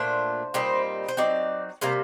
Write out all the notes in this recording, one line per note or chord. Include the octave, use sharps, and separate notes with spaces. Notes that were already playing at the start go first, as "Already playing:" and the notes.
Already playing: A#2 A3 D4 C5
A#2 G3 C4 D#4
C5
F#3 C4 D#4 D5
C3 G3 A#3 C5